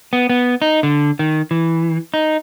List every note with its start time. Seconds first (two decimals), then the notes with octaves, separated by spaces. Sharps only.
0.13 B3
0.29 B3
0.62 D#4
0.83 D3
1.19 D#3
1.51 E3
2.14 D#4